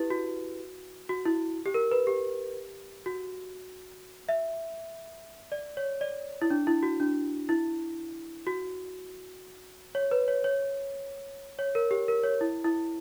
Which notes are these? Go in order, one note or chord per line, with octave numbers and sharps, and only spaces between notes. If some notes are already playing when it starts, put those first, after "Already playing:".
Already playing: E4 G4 B4
F#4
F#4
E4
G4
A#4
B4
G4
F#4
E5
D5
C#5
D5
E4
D4
E4
F#4
D4
E4
F#4
C#5
B4
C#5
C#5
C#5
A#4
G4
A#4
C#5
E4
E4